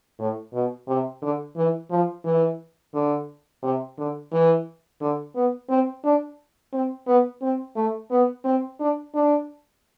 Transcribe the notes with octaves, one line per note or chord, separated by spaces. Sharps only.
A2
B2
C3
D3
E3
F3
E3
D3
C3
D3
E3
D3
B3
C4
D4
C4
B3
C4
A3
B3
C4
D4
D4